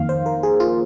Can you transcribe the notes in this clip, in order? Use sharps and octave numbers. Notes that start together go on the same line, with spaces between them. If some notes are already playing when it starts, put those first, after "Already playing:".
Already playing: F2 D#3 A#3 F5
C5
A#4
G#4
F4